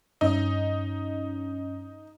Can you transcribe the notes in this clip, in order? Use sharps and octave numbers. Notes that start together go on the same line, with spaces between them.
G2 C#4 D#4